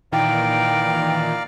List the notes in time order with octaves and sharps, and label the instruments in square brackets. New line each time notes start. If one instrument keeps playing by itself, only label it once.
[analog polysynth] A#2 D#3 E3 [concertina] D5 F5 A#5 [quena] G5